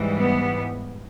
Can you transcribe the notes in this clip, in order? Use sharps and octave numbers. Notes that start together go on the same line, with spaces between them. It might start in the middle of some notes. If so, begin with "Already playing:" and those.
Already playing: G#2 E3 G3
B3